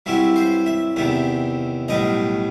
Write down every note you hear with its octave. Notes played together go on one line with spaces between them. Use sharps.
G2 F#3 C4 E4 E5
C5
E5
E2 C3 D#3 E5
B1 A2 G3 D#5